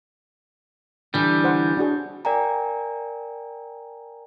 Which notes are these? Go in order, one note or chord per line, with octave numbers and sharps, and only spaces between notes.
D3 E3 G3
C5 F#5
D4 F#4 G#4
A#4 D5 G5 G#5 A#5